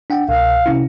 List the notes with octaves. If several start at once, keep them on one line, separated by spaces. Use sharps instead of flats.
D4 F#5 G5
C2 B2 F5
C3 C#4 E4